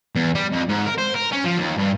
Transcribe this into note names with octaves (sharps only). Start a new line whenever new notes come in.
E2
G3
F2
G#2
A#4
C5
A#4
C#4
F3
D#2
G2